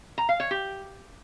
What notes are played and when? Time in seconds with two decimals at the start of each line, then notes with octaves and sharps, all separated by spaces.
0.18 A#5
0.29 F5
0.40 C#5
0.51 G4